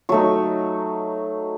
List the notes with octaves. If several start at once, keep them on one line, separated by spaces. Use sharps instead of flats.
F#3 A3 D#4 C#6